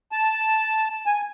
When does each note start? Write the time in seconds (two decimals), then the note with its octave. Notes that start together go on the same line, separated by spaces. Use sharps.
0.12 A5
1.06 G#5